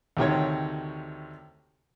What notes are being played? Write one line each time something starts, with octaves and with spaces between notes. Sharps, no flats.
D2 C3 D#3 C#5